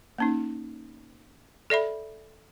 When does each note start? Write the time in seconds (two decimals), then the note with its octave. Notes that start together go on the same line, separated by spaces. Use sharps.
0.18 A#3 C#4 D#4
1.70 A4 D5 E5 B5